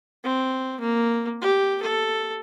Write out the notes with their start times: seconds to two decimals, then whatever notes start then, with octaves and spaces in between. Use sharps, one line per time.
0.24 C4
0.80 A#3
1.41 G4
1.82 A4